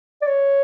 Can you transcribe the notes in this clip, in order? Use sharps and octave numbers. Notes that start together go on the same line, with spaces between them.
D5
C#5